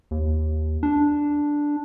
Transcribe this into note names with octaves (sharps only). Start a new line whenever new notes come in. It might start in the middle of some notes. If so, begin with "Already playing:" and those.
D#2
D4